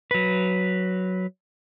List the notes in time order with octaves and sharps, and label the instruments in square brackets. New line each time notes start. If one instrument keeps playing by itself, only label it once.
[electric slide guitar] F#3 B4